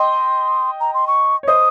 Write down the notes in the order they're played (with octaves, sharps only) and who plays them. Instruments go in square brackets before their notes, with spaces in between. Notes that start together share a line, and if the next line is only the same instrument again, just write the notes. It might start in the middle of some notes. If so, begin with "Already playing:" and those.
Already playing: [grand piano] D#5 G5 [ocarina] C6
[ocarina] A#5
C6
C#6
[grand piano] C#5
[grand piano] C5 D#5 [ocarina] D#6